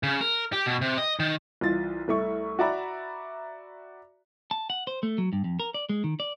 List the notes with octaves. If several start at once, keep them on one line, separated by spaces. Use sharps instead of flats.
C#3
A#4
G4
B2
C3
D#5
D#3
C2 E3 F4 A6
C2 A3 E4 C#6
F#4 D5 E5 A#5 B5
A5
F#5
C5
A3
F#3
G2
F2
A#4
D5
G#3
D#3
D5